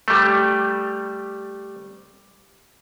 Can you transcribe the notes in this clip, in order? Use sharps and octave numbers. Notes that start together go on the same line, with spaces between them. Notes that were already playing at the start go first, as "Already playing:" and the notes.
G3 A3